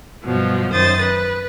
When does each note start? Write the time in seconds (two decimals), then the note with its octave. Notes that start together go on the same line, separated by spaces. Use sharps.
0.24 G2 B2 F3 F#3
0.71 F#2 D#3 C5 D#6 A6
1.02 B4